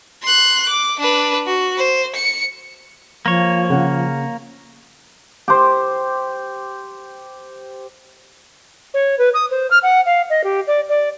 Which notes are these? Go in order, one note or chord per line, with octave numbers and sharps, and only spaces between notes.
C6 F#6
D6
D4 B4
F#4
C5
C#7
F3 A#3 C#5
C#3 C#4 F#5
G4 C5
C#5
B4
D#6
C5
F6
F#5
F5
D#5
G4
D5
D5